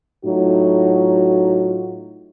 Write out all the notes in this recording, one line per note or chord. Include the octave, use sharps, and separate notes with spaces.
A2 F#3 D#4 F4 F#4